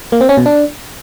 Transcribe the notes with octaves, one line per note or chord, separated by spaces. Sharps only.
A#3
C4
C#4
B2
D4